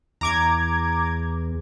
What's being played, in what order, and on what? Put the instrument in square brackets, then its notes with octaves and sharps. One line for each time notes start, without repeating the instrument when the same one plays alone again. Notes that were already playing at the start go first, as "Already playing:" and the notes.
[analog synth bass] E2 [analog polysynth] A#5 D6 G#6